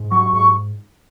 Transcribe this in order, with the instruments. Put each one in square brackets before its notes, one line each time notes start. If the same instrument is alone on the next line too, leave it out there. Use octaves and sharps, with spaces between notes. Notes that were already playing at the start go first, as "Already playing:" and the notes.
Already playing: [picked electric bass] G#2
[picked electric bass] F#3 [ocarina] C#6
[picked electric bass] G#2 [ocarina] C#6